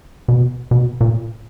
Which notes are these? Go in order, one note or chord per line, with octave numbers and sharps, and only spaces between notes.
B2
B2
A#2